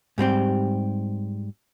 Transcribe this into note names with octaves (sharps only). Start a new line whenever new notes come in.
G#2 G3 C4 G4